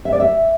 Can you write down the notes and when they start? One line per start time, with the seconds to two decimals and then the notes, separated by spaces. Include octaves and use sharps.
0.05 E5
0.12 D5
0.20 E5